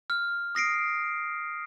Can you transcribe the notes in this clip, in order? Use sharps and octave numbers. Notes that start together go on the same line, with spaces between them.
F6
D#6 A#6 C7 D7